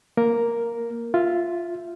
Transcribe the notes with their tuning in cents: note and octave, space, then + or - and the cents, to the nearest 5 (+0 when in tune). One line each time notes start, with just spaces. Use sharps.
A#3 +0 A#4 +0
F4 +0 E5 +15